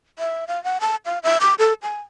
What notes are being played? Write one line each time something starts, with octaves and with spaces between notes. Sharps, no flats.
E5
F5
F#5
A5
F5
E5
D6
A4
G#5